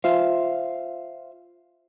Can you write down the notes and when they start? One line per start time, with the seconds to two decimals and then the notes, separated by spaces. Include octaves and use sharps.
0.04 F4 C5 E5 F5